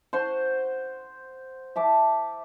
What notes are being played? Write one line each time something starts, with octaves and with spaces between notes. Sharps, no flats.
C5 F#5 C6 C#6
E5 A5 D6